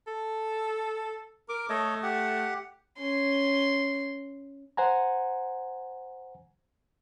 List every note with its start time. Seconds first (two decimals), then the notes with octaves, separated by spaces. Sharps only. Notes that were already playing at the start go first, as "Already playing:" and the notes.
0.07 A4
1.49 A#4 D6
1.69 A3 A4 C#5 D#5
2.03 G4 F#5
2.98 C#4 C6
4.77 C5 F#5 G#5 A#5